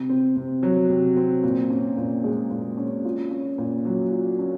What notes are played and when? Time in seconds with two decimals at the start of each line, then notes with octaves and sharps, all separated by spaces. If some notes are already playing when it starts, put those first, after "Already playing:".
Already playing: C3
0.09 C4
0.36 C3
0.63 F#3
0.89 C3
1.17 C4
1.43 A#2
1.70 C#4
1.97 A#2
2.24 G#3
2.51 A#2
2.77 C#4
3.05 F4
3.31 C#4
3.58 A#2
3.85 F#3
4.12 F4
4.39 C#4